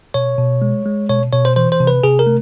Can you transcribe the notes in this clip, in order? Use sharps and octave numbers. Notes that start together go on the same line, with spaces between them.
B2 C#5
B2
G#3
G#3
B2 C#5
B2 C#5
C5
E3 C5
C5
C3
B4
C3 G#4
A#4
A3